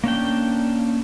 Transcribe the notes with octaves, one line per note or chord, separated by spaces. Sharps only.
A#3 C#4 D4 G5